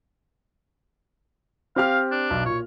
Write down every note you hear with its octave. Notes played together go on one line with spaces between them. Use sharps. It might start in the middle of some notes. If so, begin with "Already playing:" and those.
C4 G4 F5 F6
D4
B1
A#2 C#5